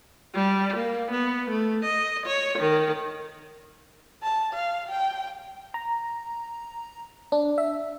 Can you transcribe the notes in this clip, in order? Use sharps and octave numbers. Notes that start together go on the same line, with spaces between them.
G3
A#3
B3
A3
D#5
C#5
D#3
A5
F5
G5
A#5
D4
E5